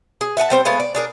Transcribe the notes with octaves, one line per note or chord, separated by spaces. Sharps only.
G#4
E5 F#5 G#5 A5
G3 C4 C5
G#3 A3 B3 F5
D5
D4 G#4 A#4